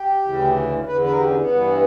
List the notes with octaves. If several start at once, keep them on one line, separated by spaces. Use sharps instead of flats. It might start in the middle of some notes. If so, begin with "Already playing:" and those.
Already playing: G4
D2 C#3 E3
E2 D3 B4
B4
A#4
G4
C#4
B3
G2 E3